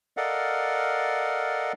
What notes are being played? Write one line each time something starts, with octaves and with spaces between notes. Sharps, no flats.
A4 A#4 D5 D#5 F5 F#5